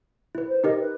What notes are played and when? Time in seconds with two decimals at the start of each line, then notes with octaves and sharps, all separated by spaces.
0.35 E4 B4
0.48 C5
0.64 D#4 G4 A#4 D#5
0.80 B4